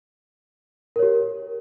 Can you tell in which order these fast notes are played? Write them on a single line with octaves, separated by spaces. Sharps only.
A#4 C#5 G4